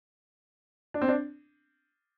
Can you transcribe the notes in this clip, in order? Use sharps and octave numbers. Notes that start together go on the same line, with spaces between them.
D4
C4
D4